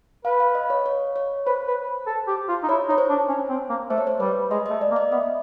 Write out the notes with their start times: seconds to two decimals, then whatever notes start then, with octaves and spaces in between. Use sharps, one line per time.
0.25 B4 F5
0.40 F5
0.55 D#5
0.70 C#5
0.86 C#5
1.16 C#5
1.47 B4 C5
1.67 B4
2.07 A4
2.28 G4
2.49 F4
2.63 D#4
2.69 E4 C#5
2.88 D#4 C#5
2.98 C5
3.09 D4
3.29 C#4
3.49 C4
3.69 A#3
3.89 A3 C5
3.98 C#5
4.07 C5
4.20 G3 B4
4.51 G#3 D#5
4.66 A3 D#5
4.81 D5
4.91 A#3
4.96 D#5
5.12 B3 E5